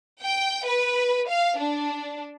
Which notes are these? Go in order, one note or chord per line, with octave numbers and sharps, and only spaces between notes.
G5
B4
F5
D4